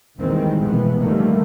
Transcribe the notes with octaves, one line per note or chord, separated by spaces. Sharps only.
D#2 D#3 E3 G3 G#3 C4
F1 B2 E3 F3 B3
D3 D#3 F3 G3 A3 A#3